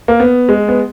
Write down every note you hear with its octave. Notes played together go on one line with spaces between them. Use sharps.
A#3
B3
G#3
B3